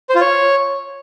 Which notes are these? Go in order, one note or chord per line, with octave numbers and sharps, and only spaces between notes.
C5
F4
C#5